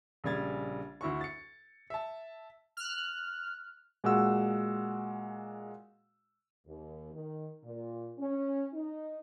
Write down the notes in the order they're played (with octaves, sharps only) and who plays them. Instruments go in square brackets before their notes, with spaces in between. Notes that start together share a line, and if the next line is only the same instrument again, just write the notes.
[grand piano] A#1 C#3 G3 G#6 A6
D2 E4 F#4 C#6
A6 C#7
E5 A5
[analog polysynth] F6 F#6
[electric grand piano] A#2 G#3 F#4 F#5 E6
[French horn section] D#2
D#3
A#2
C#4
D#4